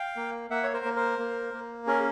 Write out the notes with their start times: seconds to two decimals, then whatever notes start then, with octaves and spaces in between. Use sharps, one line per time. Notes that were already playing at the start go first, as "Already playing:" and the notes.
Already playing: F5 G5
0.16 A#3
0.50 A#3 E5 F#5
0.63 C#5
0.73 A#4 C5
0.85 A#3
0.96 A#4 C5
1.19 A#3
1.54 A#3
1.87 C#4 G#4 A#4